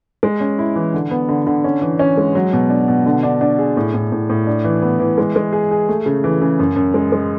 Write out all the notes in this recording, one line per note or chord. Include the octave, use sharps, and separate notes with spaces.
G#3
C#4
E4
E3
D3
B3
D3
D3
C#4
E3
C#4
G#3
F#3
B2
D4
B2
D3
D4
D4
G#4
A2
A2
A2
A2
D4
E3
B3
E3
G#3
G#3
G#4
G#4
A3
C#3
E3
C#3
F#2
F#2
G#3
G#3